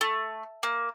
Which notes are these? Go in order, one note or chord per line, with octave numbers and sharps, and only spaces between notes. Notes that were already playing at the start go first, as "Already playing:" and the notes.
A3
A#3